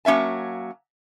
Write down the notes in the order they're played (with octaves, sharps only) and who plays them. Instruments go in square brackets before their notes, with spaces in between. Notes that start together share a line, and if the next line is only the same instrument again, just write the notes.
[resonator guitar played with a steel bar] F#3 A#3 C#4 E5 A5